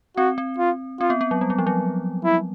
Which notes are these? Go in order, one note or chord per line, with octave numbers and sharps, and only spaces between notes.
C4 F#4
C4
F4
C4 F4
B3
B3
F#3
G3
F#3
F3
F#3
E4